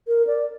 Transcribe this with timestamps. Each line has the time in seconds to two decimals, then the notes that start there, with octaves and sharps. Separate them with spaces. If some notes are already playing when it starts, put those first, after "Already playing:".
0.07 A#4
0.27 D5